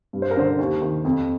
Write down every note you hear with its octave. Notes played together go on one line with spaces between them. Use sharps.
G2
C5
A#4
D3 C5
D#2
D#3
F2